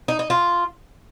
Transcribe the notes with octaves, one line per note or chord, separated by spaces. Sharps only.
D#4
D#4
F4